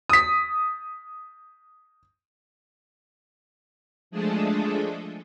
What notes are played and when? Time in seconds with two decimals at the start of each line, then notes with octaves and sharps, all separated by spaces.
0.09 D#6 B6
4.11 F3 G#3 A3 D4 G#4 A4